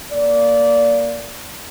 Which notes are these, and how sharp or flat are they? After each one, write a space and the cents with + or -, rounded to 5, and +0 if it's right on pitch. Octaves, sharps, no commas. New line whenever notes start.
A#3 +0 D5 -20